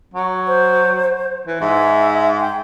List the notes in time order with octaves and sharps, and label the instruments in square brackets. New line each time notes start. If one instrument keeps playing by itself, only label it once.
[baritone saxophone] F#3
[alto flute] C5
[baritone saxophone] E3
[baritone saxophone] G#2 [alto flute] E5
[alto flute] G5